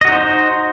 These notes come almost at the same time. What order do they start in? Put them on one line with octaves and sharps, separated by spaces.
D#5 F#4 D#4 C5